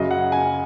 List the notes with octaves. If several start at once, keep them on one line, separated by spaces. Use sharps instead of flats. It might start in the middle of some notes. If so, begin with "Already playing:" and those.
Already playing: F#2 C#3 F#3 D#5
F#5
G#5